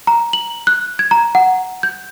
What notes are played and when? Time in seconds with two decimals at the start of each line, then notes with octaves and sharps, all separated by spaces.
0.07 A#5
0.33 F#7
0.67 F#6
0.99 G#6
1.11 A#5
1.35 F#5
1.83 G6